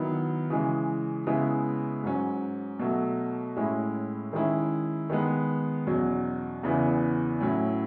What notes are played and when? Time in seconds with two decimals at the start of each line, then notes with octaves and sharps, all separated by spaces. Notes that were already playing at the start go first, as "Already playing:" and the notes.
Already playing: D#3 F#3 B3 E4
0.50 C#3 E3 G#3
1.27 C#3 G#3 B3 E4
2.03 G#2 F#3 C#4
2.79 B2 F#3 A3
3.57 A2 G#3 C#4 E4
4.33 D#3 G#3 C#4 E4
5.10 D#3 G#3 B3
5.87 E2 B2 F#3 C#4
6.63 E2 C#3 E3 B3 E4
7.40 A2 F#3 C#4 E4